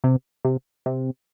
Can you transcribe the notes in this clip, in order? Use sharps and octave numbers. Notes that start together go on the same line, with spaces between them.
C3
C3
C3